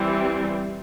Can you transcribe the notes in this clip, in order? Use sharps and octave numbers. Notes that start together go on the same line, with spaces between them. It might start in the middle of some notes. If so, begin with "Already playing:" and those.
Already playing: E3 G3 C4